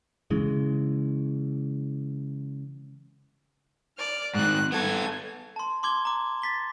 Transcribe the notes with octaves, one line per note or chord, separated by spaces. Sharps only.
C#3 E3 G#3
D5 F6
G#2 D#3 F#6
B3 A4 G#6
A5 C6
C6 D6 G#6 G7
A#5 D6
A6 B6 G7